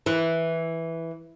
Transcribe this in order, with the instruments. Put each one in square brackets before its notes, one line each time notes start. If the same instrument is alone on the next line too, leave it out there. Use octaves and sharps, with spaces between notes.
[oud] E3